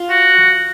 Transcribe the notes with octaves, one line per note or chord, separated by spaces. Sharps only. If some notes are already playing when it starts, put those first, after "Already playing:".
Already playing: F4
F#4